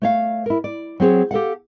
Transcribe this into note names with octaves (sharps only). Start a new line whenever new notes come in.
A3 C#5 F5
E4 A#4
D5
F#3 C4 G#4 C#5
G4 A4 F5 F#5